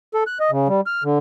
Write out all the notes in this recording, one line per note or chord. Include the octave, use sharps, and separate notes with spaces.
A4
F#6
D#5
C#3
G3
F6
D3